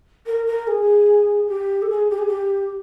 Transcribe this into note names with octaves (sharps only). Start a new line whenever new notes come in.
A#4
A#4
G#4
G4
A4
G#4
G4
G#4
G4